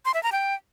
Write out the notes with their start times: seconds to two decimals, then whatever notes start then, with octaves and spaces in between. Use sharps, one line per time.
0.05 C6
0.14 E5
0.23 A#5
0.32 G5